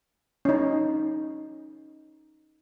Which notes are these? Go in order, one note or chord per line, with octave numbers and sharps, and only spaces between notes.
C#4 D#4